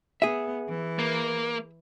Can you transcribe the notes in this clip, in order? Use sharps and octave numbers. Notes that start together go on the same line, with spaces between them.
B3 G#4 E5
E3
A#3